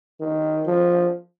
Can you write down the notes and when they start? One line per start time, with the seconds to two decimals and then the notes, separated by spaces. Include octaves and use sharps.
0.21 D#3
0.67 F3